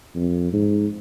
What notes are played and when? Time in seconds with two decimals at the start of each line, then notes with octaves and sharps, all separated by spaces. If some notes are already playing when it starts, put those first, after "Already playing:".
0.15 F2
0.53 G#2